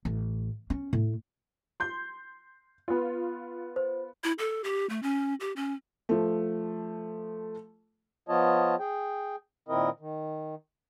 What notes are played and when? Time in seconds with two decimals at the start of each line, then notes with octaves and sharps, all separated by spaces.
0.05 A1
0.70 C#4
0.93 A2
1.80 C6 G6
2.88 B3 F4
3.76 C5
4.24 E4
4.39 A4
4.64 G4
4.89 A3
5.03 C#4
5.40 G4
5.56 C#4
6.09 F3 A3
8.29 F3 B3 F4 C#5 D#5 A5
8.79 G#4 G5
9.68 A#2 D#3 C4 E4 A#4 D#5
10.00 D#3